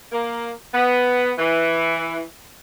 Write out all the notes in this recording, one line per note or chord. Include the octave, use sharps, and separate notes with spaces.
A#3
B3
E3